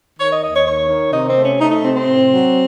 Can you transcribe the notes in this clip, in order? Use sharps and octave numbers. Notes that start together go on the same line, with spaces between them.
D#3 C#5
D#5
D#2 D#5
C#5
D#3 C#5
D#3
C3 D#4
C4
A3
C#4
A3 D#4
D#4
C3 C4
C4
A2
F#3